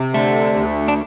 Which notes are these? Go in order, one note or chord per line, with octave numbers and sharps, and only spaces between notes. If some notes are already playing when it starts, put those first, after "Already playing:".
Already playing: C3
D3 A3
D2
D4